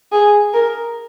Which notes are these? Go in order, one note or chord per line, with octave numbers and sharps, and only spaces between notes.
G#4
A#4